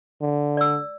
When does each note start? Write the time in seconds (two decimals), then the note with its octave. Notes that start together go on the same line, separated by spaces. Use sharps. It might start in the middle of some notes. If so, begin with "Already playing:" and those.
0.21 D3
0.57 D5 E6